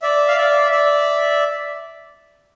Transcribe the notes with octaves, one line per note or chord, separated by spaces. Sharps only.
D5 E5
F5
D5 E5
D5 E5